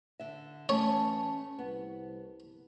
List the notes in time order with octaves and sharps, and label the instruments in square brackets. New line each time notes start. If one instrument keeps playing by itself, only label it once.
[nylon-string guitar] D3 E5
[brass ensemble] A1 E3 A5 [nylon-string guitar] A3 C#4 [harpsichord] C#5
[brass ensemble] C2 [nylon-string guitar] B3